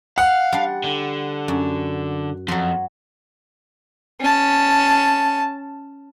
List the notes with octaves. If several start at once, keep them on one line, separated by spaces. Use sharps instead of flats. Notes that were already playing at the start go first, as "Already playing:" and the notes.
F5 F#5
G3 D4 C6
D3
F#2
F2 F#3 C6
C#4 A5